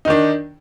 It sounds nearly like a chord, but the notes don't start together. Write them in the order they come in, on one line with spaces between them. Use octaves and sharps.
D#4 D#3 D4